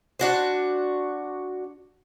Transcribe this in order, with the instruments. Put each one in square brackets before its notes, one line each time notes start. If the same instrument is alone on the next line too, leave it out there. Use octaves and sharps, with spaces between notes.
[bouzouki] D4 F#4 C5